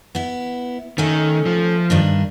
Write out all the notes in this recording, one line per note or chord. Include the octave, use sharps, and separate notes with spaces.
B3 E4
D#3 A3 C#4
F3
G2 D#3 D4